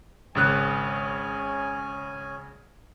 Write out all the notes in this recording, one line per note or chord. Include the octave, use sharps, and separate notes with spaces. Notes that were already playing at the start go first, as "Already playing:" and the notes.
G#1 C#3 C#4 G#5 F#6